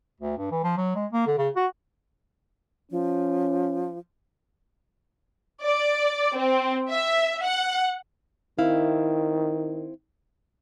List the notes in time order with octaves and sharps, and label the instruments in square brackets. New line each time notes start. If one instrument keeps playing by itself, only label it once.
[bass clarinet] D2
G2
E3
F3
F#3
G#3
A#3
D3
C#3
F#4
[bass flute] F3 [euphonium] C#4
[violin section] D5
C4
E5
F#5
[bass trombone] D#3 [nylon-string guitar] C4 E4 F5